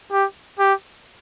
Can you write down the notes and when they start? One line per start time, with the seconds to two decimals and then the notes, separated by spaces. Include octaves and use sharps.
0.11 G4
0.59 G4